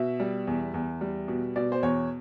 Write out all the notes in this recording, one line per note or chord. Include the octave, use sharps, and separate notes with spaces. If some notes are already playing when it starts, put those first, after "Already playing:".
Already playing: B2 E5
G3
E2
E2
G3
B2
B2 D5
C5
E2 C#5